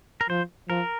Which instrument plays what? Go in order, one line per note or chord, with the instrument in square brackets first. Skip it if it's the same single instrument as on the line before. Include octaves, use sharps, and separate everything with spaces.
[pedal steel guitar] A#4
[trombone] F3 [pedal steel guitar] C5
[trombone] F3 [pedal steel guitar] A#4